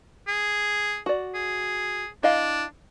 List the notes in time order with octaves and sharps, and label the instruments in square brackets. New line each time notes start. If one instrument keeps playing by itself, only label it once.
[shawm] G#4
[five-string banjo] F#4 D5
[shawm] G#4
[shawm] D4 [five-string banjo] E4 D#5 F5